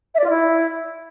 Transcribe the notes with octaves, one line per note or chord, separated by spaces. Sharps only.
E5
D5
F4
E4